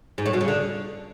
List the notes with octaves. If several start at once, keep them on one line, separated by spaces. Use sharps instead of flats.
G#2
A2
B2
C#3
D3